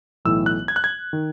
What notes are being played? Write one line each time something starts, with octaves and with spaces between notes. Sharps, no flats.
B1 A2 E3 E6
F#6
G#6
F#6
G#6
D#3